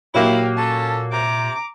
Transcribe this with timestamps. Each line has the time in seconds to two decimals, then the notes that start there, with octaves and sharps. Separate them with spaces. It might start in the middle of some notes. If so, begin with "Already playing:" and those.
0.15 A#2 F#3 A#3 E4 G4 F5
0.57 C#4 A4 A5
1.12 C3 A#5 D6